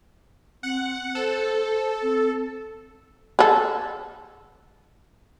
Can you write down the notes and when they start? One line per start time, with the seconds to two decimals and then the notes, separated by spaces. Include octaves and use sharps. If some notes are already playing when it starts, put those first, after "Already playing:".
0.63 C4 F#5
1.15 A4 C5
2.02 C4
3.39 G#4 A4